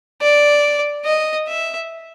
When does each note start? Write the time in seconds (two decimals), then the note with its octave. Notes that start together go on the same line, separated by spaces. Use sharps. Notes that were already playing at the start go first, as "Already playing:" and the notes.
0.22 D5
1.05 D#5
1.47 E5